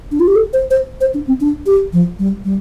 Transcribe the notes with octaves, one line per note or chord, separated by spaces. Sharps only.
D4
F4
G4
A4
C5
C5
C5
D4
C4
D4
G4
F3
G3
G3